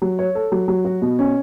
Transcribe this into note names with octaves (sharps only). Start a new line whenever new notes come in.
F#3
C#5
A4
F#3
F#3
F#4
B2
C#4